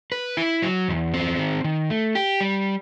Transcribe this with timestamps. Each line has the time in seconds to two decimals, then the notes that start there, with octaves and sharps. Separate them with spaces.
0.12 B4
0.37 E4
0.62 F#3
0.88 E2
1.14 C4
1.39 D#3
1.64 D#3
1.90 A3
2.15 G4
2.41 G3